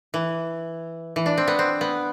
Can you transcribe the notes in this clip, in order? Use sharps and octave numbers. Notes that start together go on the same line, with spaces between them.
E3
E3
D4
C4
B3
C4
B3